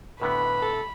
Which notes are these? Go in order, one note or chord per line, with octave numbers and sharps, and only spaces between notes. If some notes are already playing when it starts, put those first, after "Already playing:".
A2 D3 B3 B4 B5
A4